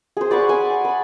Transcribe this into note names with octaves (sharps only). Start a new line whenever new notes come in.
G#4 C5
D5 F#5 B5 C#6
G#5
B5